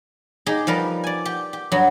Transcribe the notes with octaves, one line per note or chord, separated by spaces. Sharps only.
D#4 G4 G#4
F3 G3 A#4 B4
D5 G#5
G4
G4
G2 F#3